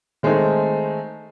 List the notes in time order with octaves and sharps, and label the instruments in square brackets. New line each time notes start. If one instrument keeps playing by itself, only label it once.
[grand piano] D#3 G#3 A3 C4 D#4